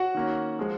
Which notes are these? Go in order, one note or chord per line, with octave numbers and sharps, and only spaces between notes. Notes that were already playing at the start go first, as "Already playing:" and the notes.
Already playing: F#4 F#5
D#3 A#3 C#4
F3 G#3